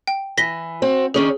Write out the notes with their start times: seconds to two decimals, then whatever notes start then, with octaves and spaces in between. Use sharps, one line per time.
0.07 G5
0.38 E3 A#6 B6 G7
0.82 C4 F#4
1.14 D#3 C#4 D4 G#4